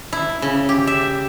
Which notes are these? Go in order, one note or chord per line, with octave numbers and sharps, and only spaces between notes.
E4
C#3
G4
E5